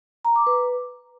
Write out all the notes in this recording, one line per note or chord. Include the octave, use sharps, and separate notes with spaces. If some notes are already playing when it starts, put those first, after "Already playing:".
A#5
D6
B4